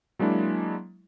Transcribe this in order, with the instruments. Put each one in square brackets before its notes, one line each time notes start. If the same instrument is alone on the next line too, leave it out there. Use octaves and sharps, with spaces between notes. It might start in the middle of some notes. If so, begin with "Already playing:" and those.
[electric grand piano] F#3 G#3 A#3 D4 E4